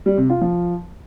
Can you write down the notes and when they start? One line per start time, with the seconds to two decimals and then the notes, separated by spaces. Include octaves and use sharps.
0.06 G3
0.18 C3
0.30 F4
0.41 F3